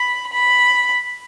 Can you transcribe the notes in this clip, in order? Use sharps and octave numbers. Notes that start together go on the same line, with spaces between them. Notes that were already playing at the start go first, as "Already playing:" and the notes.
Already playing: B5
B5